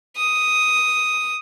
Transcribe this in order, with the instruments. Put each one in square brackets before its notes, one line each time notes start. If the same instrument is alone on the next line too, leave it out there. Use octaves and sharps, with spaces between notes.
[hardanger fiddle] D#6